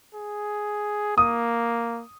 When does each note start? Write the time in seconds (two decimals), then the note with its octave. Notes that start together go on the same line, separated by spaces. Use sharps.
0.15 G#4
1.18 A#3 D#6